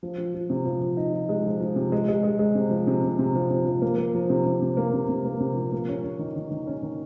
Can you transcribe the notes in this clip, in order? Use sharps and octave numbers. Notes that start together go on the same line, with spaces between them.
F3
F3
F3
C3
F3
F3
D#4
F3
G#3
F3
F3
C3
G#3
G#3
G#3
G#3
C3
F3
C3
C3
C3
F3
C3
F3
A#3
A#3
F3
C3
C3
C3
A#3
C3
C3
A#3
C3
F3
A#3
C#4
C#4
D#3
D#3
D#3
C#4
D#3